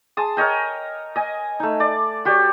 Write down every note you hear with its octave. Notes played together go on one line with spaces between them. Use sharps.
G#4 A5 C6 D#6
A#4 C#5 D#5 G5
D#5 G#5
A3 D#4
D5
F#4 G4 C#5 D5